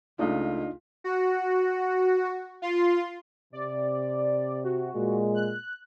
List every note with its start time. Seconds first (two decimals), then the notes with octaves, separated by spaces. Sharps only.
0.19 C#2 A3 D4 D#4 F4 D#5
1.04 F#4
2.62 F4 C6
3.53 C3 D5
4.64 F#4
4.94 A#2 G#3
5.35 F#6